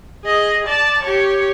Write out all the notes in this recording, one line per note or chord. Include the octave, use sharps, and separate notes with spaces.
G#4 D#5
D5 A5
G4 C#5